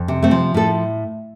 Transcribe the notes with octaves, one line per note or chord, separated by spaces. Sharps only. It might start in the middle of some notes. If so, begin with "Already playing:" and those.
Already playing: F2
C3
A3 C4
F3
A2 A4